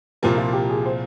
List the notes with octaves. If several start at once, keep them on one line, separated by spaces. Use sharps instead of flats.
C2 A#2 F3 A#3 G4
F4
G4
G#4
C5